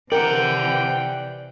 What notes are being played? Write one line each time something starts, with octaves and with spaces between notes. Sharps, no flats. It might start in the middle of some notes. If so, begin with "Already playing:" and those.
C3 E3 A#4 D5 F#5 G5